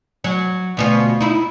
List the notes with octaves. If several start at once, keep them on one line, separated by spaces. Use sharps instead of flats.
F#3
D2 B2 F4
D#4 E4